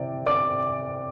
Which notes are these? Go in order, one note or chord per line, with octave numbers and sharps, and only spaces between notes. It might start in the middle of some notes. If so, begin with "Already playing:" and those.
Already playing: C3 E3 D5
D5 D6